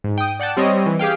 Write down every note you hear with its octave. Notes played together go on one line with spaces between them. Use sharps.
G#2
G5 D#6
D5 F#5 G5 A5
G3 C4 C#5 D#5
E3
G4 G#4 F5 G5